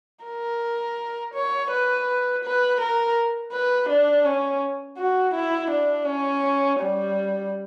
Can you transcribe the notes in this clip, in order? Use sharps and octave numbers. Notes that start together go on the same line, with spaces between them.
A#4
C#5
B4
B4
A#4
B4
D4
C#4
F#4
E4
D4
C#4
G3